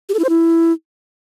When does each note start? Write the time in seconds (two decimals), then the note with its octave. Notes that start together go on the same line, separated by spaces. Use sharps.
0.09 G4
0.14 A4
0.19 E4
0.24 C5
0.29 E4